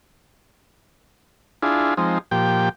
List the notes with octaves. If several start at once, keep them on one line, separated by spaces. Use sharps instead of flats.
D4 E4 F4 G#4
F3 G#3 C4 D#4
A#2 F3 G4 G5